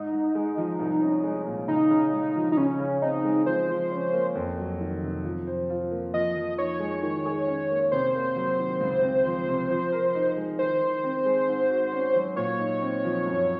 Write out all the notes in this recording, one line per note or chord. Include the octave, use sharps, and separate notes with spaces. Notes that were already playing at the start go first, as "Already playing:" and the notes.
Already playing: G#2 D#4
G#2
G#3
F3
C2
C#4
G#3
A#2
C#3 D#4
C#3
G#3
F3
D#4
C#3 C#4
C#3
C4 D#4
G#3
F3 C5
F3
C#4
A#3
F2
F#3
D#3
C3
F3
C5
F4
A#3
F3 D#5
F3
D#4 C#5
G#3
D#3
G#4
C#4
A#3
C3 C5
A#3
F#3
D#3
C#2
C4
F3
C3
F3
A#4
D#4
G#3
D#3 C5
D#3
C4
G#3
G#2
F#4
C#4
F#3
A#2 C#5
D#4
C4
F3
F#2